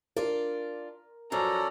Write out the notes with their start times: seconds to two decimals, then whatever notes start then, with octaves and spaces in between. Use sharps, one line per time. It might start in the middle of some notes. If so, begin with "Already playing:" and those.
0.16 D4 F4 A#4 D5
1.32 F#2 F3 C#4 A4 D5 A#5